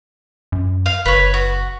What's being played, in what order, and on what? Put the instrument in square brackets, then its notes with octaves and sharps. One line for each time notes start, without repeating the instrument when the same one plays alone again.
[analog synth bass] F#2
[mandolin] F5
[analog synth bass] F#1 [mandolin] B4 C#5
[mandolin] F#4